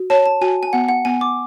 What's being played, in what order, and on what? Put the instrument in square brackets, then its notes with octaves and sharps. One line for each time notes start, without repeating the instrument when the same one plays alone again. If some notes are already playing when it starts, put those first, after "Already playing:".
Already playing: [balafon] F#4
[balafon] C#5 [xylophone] A5
[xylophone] A5
[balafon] F#4 [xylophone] G#5
[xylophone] G#5
[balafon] B3 [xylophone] F#5
[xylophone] F#5
[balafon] B3 [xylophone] G#5
[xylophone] D6